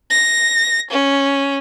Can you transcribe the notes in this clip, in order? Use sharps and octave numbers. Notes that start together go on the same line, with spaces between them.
A#6
C#4